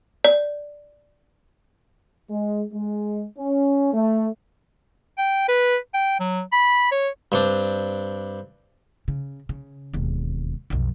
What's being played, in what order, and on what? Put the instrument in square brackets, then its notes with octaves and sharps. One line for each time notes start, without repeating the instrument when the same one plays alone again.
[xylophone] D5
[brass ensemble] G#3
G#3
C#4
A3
[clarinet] G5
B4
G5
F#3
B5
C#5
[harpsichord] G2 C4 D4
[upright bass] C#3
C#3
E1 D#2
B1 F2